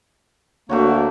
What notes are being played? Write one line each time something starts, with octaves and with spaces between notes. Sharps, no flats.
D2 A3 A#3 F#4 C#5